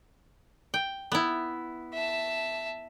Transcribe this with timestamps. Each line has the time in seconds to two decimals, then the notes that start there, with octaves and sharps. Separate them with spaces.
0.74 G5
1.12 B3 E4
1.94 E5 A5